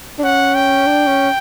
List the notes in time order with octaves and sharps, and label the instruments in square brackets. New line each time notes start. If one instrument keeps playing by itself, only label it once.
[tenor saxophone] D4
[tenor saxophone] C#4 [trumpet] F#5
[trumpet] G5
[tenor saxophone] D4
C#4